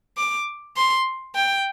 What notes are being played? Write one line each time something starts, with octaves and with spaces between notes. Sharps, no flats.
D6
C6
G5